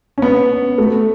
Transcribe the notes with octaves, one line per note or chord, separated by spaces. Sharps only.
C#4
B3
A3